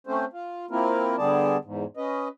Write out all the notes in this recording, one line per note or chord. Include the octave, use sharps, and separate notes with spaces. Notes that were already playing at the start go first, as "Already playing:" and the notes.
A3 C4 C#4 C5
F4
A#3 C4 E4 F4 A#4
D3 G3 B3 G#4 D5 A5
E2 G#2
C#4 B4 D#5